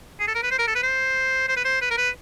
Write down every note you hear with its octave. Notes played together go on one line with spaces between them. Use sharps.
G#4
A4
A#4
B4
C5
A#4
A4
B4
C5
C5
B4
C5
B4
A#4
B4